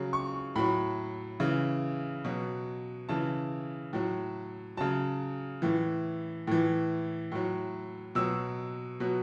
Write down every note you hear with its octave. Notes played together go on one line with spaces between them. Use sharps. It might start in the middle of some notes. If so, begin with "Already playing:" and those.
Already playing: C#3 F#3
C#6
A2 F#3 B5
C#3 E3
B2 F#3
C#3 E3 A5
A2 F#3
C#3 F#3 A5
A2 E3
A2 E3
A2 F#3
B2 F#3 E6
B2 F#3